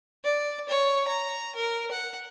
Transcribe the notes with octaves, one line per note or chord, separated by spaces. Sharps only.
D5
C#5
A#5
A#4
F#5